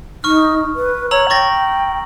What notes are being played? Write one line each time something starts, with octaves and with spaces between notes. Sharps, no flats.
D#4 C#6 F6
B4
C#5 A#5 E6 F#7
G5 C#6 A6 A#6